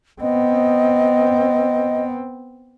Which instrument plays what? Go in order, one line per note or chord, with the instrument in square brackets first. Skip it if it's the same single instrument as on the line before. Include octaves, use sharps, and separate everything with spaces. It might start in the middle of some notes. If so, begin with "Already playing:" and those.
[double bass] B3 C4 [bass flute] D#5